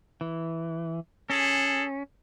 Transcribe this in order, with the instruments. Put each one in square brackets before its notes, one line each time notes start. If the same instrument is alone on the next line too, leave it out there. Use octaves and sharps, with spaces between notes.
[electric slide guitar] E3
[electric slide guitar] C#4 [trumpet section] G#4 A4